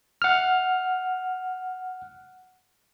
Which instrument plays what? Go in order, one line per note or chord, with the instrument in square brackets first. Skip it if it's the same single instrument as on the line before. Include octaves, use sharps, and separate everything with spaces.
[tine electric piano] F#5 F6